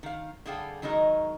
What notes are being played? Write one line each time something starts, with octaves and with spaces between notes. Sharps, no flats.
D#3 F5
D3 G3 G#4 A4 F5 G5
D#3 F#3 G#3 D#4 A#4